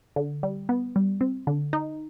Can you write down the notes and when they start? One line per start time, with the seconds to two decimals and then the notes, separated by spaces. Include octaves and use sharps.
0.16 D3
0.43 G3
0.69 B3
0.96 G3
1.21 C4
1.47 D3
1.73 D#4